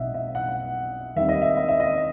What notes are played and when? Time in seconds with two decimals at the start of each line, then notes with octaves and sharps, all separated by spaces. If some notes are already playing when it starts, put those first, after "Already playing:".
Already playing: B1 B2 C4 D#5 E5 F#5
0.14 E5
0.35 F#5
1.16 D#2 D#3 G3 C4 E5
1.29 D#5
1.42 E5
1.57 D#5
1.68 E5
1.80 D#5